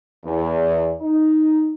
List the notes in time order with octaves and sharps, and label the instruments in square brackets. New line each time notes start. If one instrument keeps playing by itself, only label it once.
[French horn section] E2
D#4